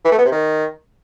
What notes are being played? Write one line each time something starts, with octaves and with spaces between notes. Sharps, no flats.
E3
A3
B3
C3
D#3